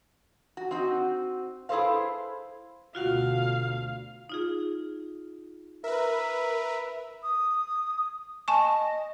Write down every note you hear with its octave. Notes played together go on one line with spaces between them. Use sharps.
F#4
C4 D#4 F#4
E4 G#4 A4 B4 C5 F5
D2 B2 D3 F4 F#4 F5 F#5
D#4 F4 G#4
A#4 B4 E5
D#6
D#5 G#5 A5 C#6